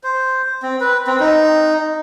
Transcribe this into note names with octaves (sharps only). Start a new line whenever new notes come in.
C5
C4
B4
C4
D#4